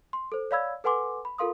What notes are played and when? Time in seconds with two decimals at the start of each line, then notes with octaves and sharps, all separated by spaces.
0.13 C6
0.32 A4 C5
0.51 C#5 D5 F5 B5 E6 G#6
0.84 A4 B4 F#5 G#5 C6 D6
1.25 B5
1.38 F4 A4 A#4 F5 C6 D#6